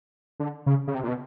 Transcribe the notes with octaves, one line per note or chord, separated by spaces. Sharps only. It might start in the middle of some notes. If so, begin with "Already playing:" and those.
D3
C#3
C#3
C3
A#2
B2